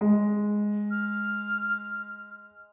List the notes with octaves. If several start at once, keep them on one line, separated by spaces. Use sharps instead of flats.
G#3
F6